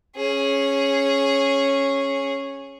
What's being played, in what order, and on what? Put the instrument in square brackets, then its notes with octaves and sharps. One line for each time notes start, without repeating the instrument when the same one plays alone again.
[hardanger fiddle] C#4 G#4